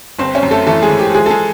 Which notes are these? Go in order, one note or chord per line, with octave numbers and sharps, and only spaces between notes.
G1 C4 C5
C#4 C#5
F#2
A3 A4
E3 A3 A4
G#3 G#4
E3
G4
F3 G#3 G#4
A4
G#3 G#4